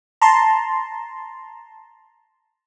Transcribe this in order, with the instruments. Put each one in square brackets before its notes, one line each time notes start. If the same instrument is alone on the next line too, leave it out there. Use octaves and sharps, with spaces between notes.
[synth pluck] A5 A#5 C6